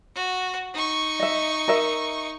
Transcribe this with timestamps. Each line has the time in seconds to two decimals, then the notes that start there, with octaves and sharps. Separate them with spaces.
0.15 F#4
0.74 D#4 C#6
1.20 D#5 E5
1.68 A#4 D#5 E5